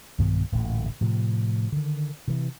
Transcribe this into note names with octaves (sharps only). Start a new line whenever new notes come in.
B1 G2 D#3 B3
D1 A1 A#2 D3
A2 C3 F3
D3 D#3
C3 E3